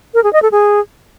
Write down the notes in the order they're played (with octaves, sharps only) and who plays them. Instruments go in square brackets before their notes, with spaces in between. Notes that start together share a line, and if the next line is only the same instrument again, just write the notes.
[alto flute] A#4
G#4
D#5
A4
G#4